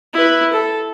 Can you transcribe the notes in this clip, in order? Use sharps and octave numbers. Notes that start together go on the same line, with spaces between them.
E4 B4
A4